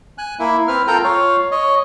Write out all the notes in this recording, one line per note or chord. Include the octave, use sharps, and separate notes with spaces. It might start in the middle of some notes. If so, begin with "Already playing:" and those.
G#5 F#6
A#3 E4
C4 B4 F6
F4 A4 A#4 G5 A#5
F4 C#5 F5
C#5 D#5